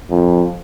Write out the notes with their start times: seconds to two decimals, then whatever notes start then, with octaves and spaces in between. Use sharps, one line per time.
0.11 F2